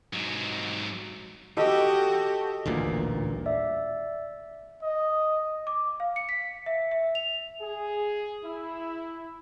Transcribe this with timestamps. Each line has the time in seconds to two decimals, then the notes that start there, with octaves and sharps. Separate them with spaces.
0.13 G#2 F#3
1.57 F#4 G4 A4 D#5 D6
2.66 D#1 A1 D2 A#2
3.46 D5 E5
4.83 D#5
5.67 D6
6.00 F5
6.16 C#7
6.29 B6
6.66 E5
6.91 E5
7.15 F7
7.61 G#4
8.44 E4